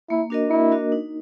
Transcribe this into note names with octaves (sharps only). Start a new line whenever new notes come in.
A#3 E4
D4 F#4 A#4 D#5
A#3 E4
D4 F#4 A#4 D#5
D#4